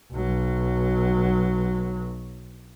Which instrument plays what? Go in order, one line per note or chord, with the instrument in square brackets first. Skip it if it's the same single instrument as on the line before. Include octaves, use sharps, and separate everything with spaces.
[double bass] B1 F#3